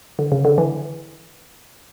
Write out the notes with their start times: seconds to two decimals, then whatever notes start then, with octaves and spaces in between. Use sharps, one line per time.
0.19 D3
0.32 C#3
0.45 D3
0.58 E3